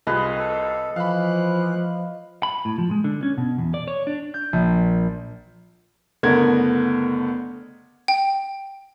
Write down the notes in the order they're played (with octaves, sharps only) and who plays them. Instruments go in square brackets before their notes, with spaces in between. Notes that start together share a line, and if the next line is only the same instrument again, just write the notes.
[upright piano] C2 F4 G#4 [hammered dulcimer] B4 D#5
[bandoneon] A4
[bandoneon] E3 F#6 [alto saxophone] F3 [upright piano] F5 B5
[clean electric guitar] B5
A2
F3
G#3
D3
C#4
B2
E2
D5
C#5
D4
[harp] G6
A#1
[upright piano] F#1 D3 A3 B3 A#4 G#6
[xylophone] G5